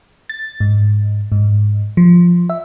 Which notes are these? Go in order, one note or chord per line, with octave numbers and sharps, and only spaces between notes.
A6
G#2
G#2
F3
E5